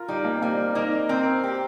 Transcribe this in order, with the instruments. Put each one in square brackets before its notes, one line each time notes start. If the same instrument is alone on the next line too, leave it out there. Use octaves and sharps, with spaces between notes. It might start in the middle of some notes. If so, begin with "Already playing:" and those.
Already playing: [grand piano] F4 A#4
[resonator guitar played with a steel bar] G3 [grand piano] D#4
[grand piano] A#3
C4
[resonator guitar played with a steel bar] G3 [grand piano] A#3
[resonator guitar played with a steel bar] A#3 [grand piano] D#4
[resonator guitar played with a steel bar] C4 [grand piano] A#4
[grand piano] C5
[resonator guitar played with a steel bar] G4 [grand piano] A#4